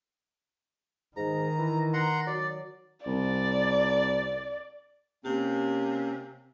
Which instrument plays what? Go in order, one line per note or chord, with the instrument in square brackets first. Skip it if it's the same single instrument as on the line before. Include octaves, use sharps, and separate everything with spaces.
[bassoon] G#2 [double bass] D#3 [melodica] A#5
[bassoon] E3
[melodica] F#5 A#5 C6
[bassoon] F#3 [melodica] D5
[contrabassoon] C2 [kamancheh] D5
[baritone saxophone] C3 [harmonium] A#3 C#4 [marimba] G4